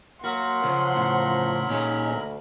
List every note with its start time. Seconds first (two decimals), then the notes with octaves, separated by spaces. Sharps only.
0.24 F#3 A#3 F#4 A#4 F#5 B5 C6
0.64 C#3 F3 C#4
0.95 A2 C#3
1.69 A#2 C#4 D#4 G#4
2.08 D2